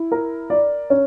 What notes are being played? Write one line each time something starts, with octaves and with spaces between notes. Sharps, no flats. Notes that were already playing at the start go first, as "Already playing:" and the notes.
Already playing: E4
A#4
D5
C#4